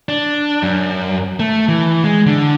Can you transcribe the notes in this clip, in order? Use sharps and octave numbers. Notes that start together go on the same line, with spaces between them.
D4
F#2
A3
E3
G#3
D3